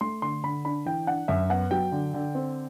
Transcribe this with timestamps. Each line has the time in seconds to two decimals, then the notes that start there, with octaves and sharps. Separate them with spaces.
0.01 A3 C6
0.22 D3 C6
0.44 D3 B5
0.65 D4 B5
0.86 E3 G5
1.07 D4 F#5
1.28 F#2 E5
1.49 B3 F#5
1.71 F#3 G5
1.92 D3
2.14 D3
2.35 C4